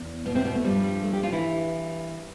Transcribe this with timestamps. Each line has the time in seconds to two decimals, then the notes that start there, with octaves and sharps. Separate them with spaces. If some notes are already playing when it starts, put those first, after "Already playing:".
Already playing: E2
0.25 B2 B3
0.35 C3 C4
0.45 B2 B3
0.55 A3
0.64 G2 F3 G3
0.84 G3
1.03 A3
1.13 G3 G4
1.23 F3 F4
1.32 E3 E4